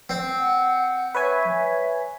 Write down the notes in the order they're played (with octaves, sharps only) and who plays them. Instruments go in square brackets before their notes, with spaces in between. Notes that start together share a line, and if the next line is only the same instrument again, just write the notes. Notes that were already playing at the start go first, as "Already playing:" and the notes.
[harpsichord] C4
[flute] F#5
[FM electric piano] B4 C#5 G#5 [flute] E5